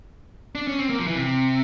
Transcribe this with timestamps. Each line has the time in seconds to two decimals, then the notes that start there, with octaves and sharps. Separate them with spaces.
0.55 D4
0.67 C#4
0.79 C4
0.90 A#3
0.98 F3
1.07 E3
1.15 C3